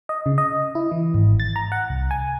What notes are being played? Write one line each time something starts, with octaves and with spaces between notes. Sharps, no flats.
D#5
C#3
D#5
E4
E3
G#1
A6
A#5
F#5
C2
G#5